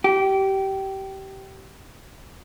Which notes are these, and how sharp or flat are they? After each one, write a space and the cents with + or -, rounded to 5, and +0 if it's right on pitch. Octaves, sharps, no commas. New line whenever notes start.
G4 -20